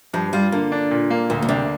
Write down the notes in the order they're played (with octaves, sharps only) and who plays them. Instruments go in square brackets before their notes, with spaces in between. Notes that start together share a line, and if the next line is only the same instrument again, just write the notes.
[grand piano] G2 [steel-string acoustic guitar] F3
[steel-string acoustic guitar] G3 [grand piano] F4
[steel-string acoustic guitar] D3 [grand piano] A#3
[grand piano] D4
A#2
A#3
[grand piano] D2 [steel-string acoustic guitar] A#2
[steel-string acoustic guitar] A#2
[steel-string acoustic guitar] C3 [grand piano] D4